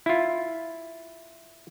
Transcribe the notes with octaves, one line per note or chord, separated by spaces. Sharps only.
E4 F4